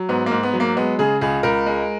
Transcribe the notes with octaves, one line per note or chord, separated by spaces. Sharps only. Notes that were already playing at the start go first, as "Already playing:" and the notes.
Already playing: F#3
G#2 B3
A#3
G#2
B3
F#3
A#3
G#3 B3
C#3 G#4
C#2 G#4
C#2 A#4
G#3